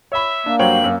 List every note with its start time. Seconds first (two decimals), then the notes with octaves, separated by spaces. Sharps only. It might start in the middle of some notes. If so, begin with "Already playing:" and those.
0.12 C#5 E5 B5
0.46 A#3 D4
0.59 G2 F#3 C5 C#5 G5 F#7
0.84 F#2